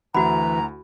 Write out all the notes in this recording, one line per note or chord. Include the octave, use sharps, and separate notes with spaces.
D2 E3 E4 F#4 F#5 A#5 B5